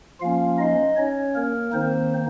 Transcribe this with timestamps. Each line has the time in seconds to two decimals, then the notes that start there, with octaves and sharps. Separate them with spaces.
0.20 F3 A#3 C#4 F4 F5
0.59 D#4 D#5
0.97 C#4 C#5
1.35 A#3 A#4
1.73 D#3 A#3 C4 D#4 C5